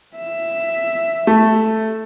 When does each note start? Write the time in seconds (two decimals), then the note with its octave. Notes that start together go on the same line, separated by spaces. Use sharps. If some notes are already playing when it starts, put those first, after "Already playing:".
0.17 E5
1.27 A3